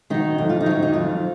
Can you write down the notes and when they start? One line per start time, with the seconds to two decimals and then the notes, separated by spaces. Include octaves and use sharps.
0.10 D#3 F#3 D#4
0.38 F2 D#4
0.49 F4
0.61 D#4
0.66 D#3 F#3
0.83 D#4
0.93 F2 F4